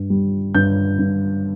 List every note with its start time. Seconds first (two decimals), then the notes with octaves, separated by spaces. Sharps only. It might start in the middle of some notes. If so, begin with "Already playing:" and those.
Already playing: G2
0.10 G3
0.54 G2 G6
0.99 G2